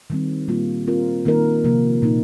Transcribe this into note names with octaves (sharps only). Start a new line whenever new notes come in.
D#3 G3 C4
A#2 G3 A#3 F4
D#3 C4 F4 A#4
D#3 A#3 D#4 A#4
C3 F3 A#3
A#2 A#3 D#4